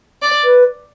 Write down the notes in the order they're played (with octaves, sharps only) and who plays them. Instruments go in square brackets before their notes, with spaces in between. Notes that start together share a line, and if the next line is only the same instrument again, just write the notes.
[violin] D5
[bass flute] B4